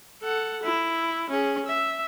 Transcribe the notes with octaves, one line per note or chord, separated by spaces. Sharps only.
A4 F#5
E4
C#4 G#4
E5